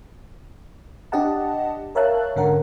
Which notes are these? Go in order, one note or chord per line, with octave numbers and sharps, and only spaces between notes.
D4 G4 D#5 F#5 A5
A#4 C#5 E5 F5 A5 F#6
G#2 D3 C#4 A#4 F#5